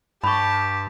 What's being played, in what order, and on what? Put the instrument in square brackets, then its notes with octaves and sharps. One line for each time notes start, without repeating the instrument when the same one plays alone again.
[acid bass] G2 [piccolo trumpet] G4 [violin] A5 [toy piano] B5 C#6